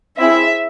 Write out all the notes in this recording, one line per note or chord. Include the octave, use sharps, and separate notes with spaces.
C4 E4 G#4 E5